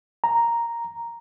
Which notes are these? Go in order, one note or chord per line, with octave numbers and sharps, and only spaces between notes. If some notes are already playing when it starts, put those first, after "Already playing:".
A#5